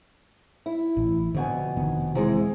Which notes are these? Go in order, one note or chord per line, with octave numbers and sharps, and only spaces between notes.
E4
A1
F2 B2 D3 G#5
F1 D#3 B3
C3 E3 G#3